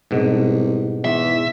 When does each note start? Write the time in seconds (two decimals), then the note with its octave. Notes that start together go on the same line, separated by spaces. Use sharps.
0.11 C2 G#2 B2
1.05 E2 E5